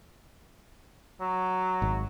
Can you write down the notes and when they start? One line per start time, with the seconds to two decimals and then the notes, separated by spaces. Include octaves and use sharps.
1.21 F#3
1.82 G#1